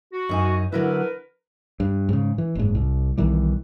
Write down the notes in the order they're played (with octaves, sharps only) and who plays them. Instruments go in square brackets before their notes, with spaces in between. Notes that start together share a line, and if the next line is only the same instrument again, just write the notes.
[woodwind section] F#4
[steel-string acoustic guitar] F#2 D#4 G#5
[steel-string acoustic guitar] D3 F#3 E4 [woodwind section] A#4 B4
[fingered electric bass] G2
G#2 C#3
E3
F#1 G#2
C2
B1 D#3 E3 G3